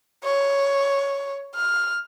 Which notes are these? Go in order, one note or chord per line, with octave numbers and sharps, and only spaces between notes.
C#5
F6